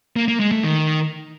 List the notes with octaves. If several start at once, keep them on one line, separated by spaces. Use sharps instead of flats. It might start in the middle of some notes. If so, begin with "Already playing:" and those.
A#3
A#3
G#3
A3
D#3